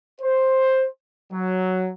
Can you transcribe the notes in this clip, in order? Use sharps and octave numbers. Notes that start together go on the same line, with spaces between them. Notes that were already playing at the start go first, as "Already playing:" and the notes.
C5
F#3